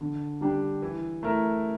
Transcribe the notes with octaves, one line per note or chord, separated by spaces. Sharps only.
D3
G3 D4 G4
E3
A3 E4 A#4